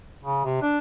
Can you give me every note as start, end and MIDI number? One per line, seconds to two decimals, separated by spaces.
0.24 0.43 49
0.45 0.61 48
0.62 0.79 62